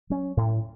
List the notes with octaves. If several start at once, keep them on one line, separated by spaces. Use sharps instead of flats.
F#3 C#4
A2